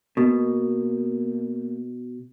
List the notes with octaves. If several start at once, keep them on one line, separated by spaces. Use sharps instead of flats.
B2 A#3